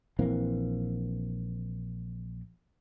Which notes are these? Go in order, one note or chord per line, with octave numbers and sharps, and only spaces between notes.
A#1 E3 A#3 C4